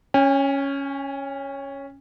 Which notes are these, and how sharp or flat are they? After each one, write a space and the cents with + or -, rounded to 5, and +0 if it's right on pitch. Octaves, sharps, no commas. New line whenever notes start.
C#4 +0 G#5 -45